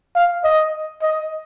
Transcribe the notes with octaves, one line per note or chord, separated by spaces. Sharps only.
F5
D#5
D#5